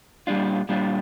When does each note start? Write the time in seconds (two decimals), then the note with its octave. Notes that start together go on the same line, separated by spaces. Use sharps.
0.27 A#2 G3 D4 F4
0.69 A#2 G3 D4 F4